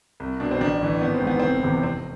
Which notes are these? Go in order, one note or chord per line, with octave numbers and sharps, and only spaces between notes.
C2
B2 D4
C4
A1 D4
A2 E3
G#1 B3
C4
G#2 E3 B3
F1 C4
B3
E2 C3 E3
F1 C4